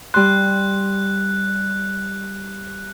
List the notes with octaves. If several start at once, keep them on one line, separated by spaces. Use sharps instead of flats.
G3 C6 F#6